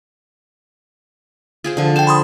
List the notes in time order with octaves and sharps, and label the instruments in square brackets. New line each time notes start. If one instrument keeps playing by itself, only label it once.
[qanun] F4 G#4 C5
D3 F3
[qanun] C5 F5 [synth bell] G5 E7
[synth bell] B5 C6 D#6